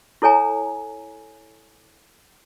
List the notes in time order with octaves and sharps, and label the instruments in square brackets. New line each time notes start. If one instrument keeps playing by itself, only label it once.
[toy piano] E4 A4 C#5 G#5 A#5